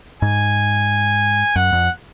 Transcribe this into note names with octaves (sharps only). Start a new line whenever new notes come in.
G#2 G#5
F#2 F#5
F2